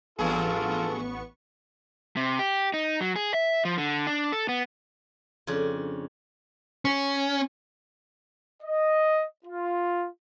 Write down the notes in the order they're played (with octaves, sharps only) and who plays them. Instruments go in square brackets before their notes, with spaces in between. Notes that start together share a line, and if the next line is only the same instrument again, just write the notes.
[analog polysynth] A1 B3 C#6 [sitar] E2 G2 G#4 [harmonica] F4 A4
[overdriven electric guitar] C3
G4
D#4
F#3
G#4
E5
F3
D3
D4
A4
B3
[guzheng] F2 C#3 C#4 D4
[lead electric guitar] C#4
[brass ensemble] D#5
F4